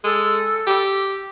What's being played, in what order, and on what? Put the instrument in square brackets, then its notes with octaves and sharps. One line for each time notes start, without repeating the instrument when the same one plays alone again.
[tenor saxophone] G#3 [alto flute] A4
[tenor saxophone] G4